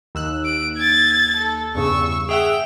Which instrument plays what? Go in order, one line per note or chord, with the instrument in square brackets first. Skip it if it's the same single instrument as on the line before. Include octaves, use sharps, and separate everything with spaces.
[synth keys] D#2 E6 F#6
[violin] D7
G#6 A6
A4
[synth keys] E2 G2 C#3 [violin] C#6 E6
[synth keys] G#4 E5 F#5 [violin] G5 F7